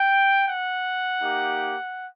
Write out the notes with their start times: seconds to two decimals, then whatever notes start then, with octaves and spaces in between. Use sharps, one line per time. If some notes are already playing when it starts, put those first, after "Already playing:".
Already playing: G5
0.47 F#5
1.22 A#3 D#4 G4